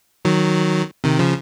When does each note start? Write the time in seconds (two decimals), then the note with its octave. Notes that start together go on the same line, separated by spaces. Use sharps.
0.25 D#3 F#3
1.04 C3 D#3
1.19 C#3 F3